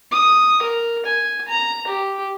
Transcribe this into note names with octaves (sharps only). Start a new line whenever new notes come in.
D#6
A#4
G#5
A#5
G4